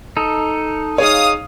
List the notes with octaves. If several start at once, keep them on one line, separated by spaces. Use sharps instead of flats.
D#4 A4
D#4 G#4 C#5 F5 D#6